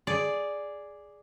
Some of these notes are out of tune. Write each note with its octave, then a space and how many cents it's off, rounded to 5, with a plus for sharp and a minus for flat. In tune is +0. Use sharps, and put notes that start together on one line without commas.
G#4 +0 D5 +0